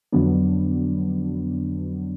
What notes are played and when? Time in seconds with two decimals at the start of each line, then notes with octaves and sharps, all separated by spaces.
0.12 F2 D3 F#3 B3 D4